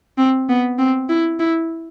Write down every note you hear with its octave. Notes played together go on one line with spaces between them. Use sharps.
C4
B3
C4
E4
E4